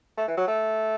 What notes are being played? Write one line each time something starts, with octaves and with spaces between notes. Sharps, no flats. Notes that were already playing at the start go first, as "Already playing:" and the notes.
A3
E3
F#3
A3